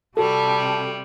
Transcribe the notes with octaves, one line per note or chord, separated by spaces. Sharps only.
C3 G3 F#4 A4 A5